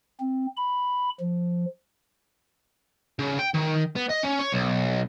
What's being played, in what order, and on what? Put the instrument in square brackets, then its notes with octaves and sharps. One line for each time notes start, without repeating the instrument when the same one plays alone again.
[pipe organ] C4
B5
F3
[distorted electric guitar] C#3
G5
D#3
B3
D#5
C#4
C#5
B1